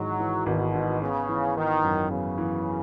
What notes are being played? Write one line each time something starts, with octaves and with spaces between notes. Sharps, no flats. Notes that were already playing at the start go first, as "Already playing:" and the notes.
Already playing: G#1 G#2 E3 F#3 G#3
E3
G#1 B2
G#2
C#3 B3
E3
G#1 D#3
F#2
C#3 B3
E3